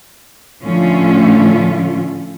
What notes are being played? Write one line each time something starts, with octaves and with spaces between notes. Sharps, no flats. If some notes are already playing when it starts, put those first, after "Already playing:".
A2 D3 F3 A3 C#4 F4